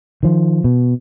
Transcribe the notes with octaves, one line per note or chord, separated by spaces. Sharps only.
D#3 F3
B2